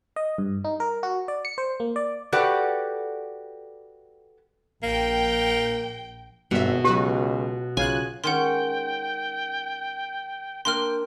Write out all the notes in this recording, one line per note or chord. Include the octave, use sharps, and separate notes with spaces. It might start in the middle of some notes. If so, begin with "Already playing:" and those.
D#5
G2
D#4
A#4
F#4
D5
C#7
C5
A#3
D5
F#4 G4 A4 B4 D5 F#5
A#1 A#3 G5
G#1 G2 B2 E5
C#2 F#3 F#4 G4 B4
B1 C#3 F4 G#5 F#6
D#3 G#3 C#4 F#5 G5 C6
A#3 D4 G5 C6 F6